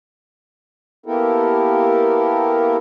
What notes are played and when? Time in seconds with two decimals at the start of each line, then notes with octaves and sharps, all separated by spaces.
1.06 A#3 B3 E4 G4 A4 A#4